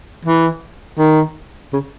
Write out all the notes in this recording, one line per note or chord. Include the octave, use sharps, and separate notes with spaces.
E3
D#3
C#3